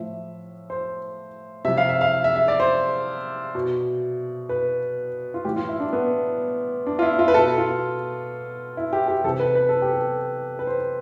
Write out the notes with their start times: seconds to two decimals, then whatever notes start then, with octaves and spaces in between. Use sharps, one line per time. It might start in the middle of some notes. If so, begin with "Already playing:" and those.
Already playing: A2 F3 E5
0.70 C5
1.65 C3 E5
1.68 F3
1.78 F5
1.89 E5
2.01 F5
2.24 E5
2.36 E5
2.48 D5
2.60 C5
3.55 B2
4.49 B4
5.34 F4
5.45 A2 E3 G4
5.56 F4
5.69 E4
5.80 D4
5.93 B3
6.87 D4
6.99 F4
7.02 E4
7.19 F4
7.28 B4
7.34 B2 A4
7.58 F4
8.77 E4
8.93 G4
9.08 G4
9.24 C3 E3 A4
9.40 B4
9.55 B4
9.69 A4
9.82 G4
9.94 A4
10.59 B4
10.67 C5